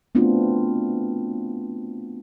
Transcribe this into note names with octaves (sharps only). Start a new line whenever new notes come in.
A3 B3 C4 D4 F4 F#4